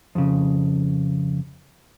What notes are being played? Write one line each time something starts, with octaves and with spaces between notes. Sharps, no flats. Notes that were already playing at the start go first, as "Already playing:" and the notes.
F2 C#3